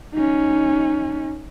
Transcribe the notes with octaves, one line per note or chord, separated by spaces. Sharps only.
C#4 D#4